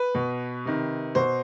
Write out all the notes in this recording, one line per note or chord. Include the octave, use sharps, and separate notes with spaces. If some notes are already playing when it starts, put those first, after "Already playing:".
Already playing: B4
B2
C3 D#3
B2 C5